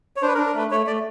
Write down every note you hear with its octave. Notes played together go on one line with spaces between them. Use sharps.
C#5
D4 C5
B4
A#4
D4
A#4
A3 B4
A3 C#5
A3 D5